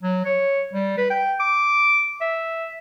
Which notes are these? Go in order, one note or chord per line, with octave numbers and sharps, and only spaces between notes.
F#3
C#5
G3
B4
G5
D6
E5